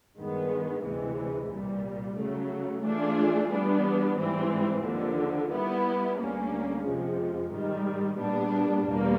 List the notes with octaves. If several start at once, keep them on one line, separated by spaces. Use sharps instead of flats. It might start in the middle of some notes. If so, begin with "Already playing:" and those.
G2 D#3 G#3 B3
D2 C3 E3 G#3
C2 A#2 G3
C#3 F#3 A3
E3 A3 D4 F4 G#4
E3 G3 B3 D4
G#2 E3 G3 C4
D#2 D3 F3
G3 B3 E4
D2 D3 G3 A#3 C#4
F2 C3 F3 G#3
G#2 D#3 G3
A#2 G3 B3 D4
E2 B2 G3 A#3